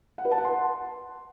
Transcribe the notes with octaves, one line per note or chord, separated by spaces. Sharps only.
F#5
B4
A5
F#5
C6